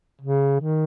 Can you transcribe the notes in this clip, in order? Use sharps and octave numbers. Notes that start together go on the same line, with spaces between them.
C#3
D#3